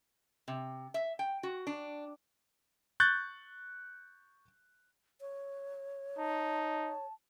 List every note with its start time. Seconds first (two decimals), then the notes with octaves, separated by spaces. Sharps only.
0.48 C3
0.94 E5
1.19 G5
1.43 F#4
1.67 D4
3.00 C#6 F#6 G6 A6
5.21 C#5
6.18 D#4 A5